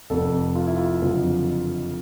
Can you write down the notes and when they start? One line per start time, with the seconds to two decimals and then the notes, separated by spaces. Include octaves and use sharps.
0.10 F1 F2 C3 A4
0.55 F4
0.66 E4
0.76 F4
1.02 F#1 F2 D3 F3